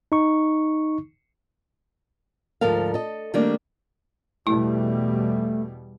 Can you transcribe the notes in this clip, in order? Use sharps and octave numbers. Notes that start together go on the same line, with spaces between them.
D#4 C#6
D2 G#2 F3 A4 A#4 F5
A4 D#5
D#3 G3 A3 A#3 C4 D4
E2 B2 G3 A3 E4